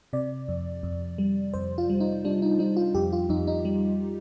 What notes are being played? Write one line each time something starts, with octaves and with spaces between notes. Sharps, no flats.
C3 D5
F2
F2
G3
F2 C5
F4
G3
D#4
G3 D4
D#4
G3 D#4
F4
F2 G4
F4
F2 D#4
D#4
G3